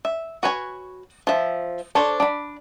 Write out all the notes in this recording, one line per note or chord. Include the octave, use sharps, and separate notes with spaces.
E5
F#4 B4 C#5 G#5
F3 E5
D4 A4 C5 C#5
D4 B5